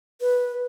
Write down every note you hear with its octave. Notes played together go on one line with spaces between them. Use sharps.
B4